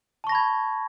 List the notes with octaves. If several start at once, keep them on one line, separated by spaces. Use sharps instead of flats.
A5 B5 C#6 G#6 A#6